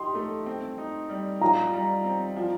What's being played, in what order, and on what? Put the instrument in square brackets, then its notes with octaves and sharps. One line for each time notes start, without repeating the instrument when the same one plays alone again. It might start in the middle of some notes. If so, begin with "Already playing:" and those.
Already playing: [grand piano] D#4 G4 [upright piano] C6
[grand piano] A3
C4
D#4
G3
[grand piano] F4 [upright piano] A#5
[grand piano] G3
C4
F3